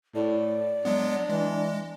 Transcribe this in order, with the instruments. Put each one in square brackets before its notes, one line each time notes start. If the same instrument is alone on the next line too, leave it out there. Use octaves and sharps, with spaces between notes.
[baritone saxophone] A2 [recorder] D5
[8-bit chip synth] F#3 G#3 B3 [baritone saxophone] D4
[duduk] E3 [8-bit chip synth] G#3